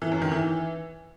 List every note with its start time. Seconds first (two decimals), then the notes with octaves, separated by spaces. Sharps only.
0.02 E3
0.12 F#2
0.22 D#3
0.32 E3